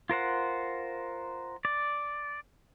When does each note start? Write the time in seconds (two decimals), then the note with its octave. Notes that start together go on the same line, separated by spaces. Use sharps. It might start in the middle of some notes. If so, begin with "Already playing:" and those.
0.10 F4 A#4 C5 F#5
1.65 D5